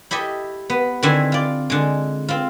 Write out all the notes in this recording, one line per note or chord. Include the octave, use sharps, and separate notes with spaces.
E4 G4 A4 D#5
B3
D3 D#3 C4 E4 G#5
F4 D5
D3 G#3
C4 F4